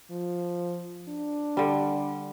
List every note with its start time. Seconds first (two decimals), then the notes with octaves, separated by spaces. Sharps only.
0.10 F3
1.08 D4
1.57 D3 G3